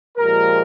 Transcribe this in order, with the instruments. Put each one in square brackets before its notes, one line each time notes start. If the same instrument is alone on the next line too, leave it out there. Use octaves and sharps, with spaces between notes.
[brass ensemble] A#2 F3 G#3 G4 A#4